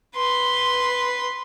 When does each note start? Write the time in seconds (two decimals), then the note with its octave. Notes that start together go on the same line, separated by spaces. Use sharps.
0.16 B4 C6